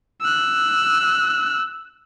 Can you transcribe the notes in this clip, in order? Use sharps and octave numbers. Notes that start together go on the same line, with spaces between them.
E6 F#6